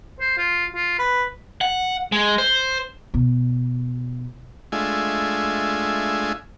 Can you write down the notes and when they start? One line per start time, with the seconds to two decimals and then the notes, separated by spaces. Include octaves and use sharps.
0.20 C5
0.38 F4
0.75 F4
0.99 B4
1.61 F#5
2.12 G#3
2.38 C5
3.14 B2
4.72 G#3 A3 D4 F4 E5 G#5